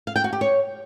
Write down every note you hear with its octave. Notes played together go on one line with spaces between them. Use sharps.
F5
G5
F#4
G4
C#5